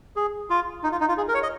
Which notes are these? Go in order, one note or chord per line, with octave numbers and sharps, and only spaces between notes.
G#4
F4
D#4
F4
D#4
F4
G#4
A#4
C#5
D#5